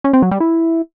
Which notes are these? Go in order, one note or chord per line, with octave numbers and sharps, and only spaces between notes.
C#4
C4
F#3
G3
E4